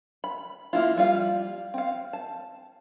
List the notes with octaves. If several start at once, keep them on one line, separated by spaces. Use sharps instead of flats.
B5
A#3 E4 F4
F3 G3 F4 F5
C4 F5
A5